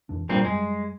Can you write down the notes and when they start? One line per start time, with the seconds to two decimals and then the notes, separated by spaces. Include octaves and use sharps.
0.09 F2 E3 D4
0.29 G#1 G2 A#2 A#3 C4
0.45 F#2 G3 G#3